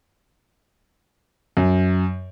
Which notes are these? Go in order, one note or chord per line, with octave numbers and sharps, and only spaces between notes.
F#2